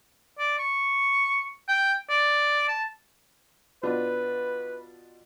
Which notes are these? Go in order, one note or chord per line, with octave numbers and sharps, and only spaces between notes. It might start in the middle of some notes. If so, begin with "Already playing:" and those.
D5
C#6
G5
D5
A5
B2 D4 F4 B4